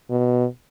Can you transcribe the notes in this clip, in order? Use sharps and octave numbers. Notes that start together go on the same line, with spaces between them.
B2